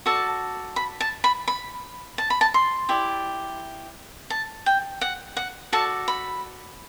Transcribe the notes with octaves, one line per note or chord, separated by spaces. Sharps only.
F#4 A4 D5 A5
B5
A5
B5
B5
A5
B5
A5
C6
E4 G4 D5
A5
G5
F#5
F#5
F#4 A4 D5 A5
B5